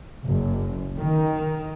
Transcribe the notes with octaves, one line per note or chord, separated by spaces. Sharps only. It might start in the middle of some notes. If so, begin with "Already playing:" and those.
F#1
D#3